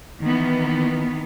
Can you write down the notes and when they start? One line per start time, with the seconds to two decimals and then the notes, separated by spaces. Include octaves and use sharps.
0.23 D#3 E3 B3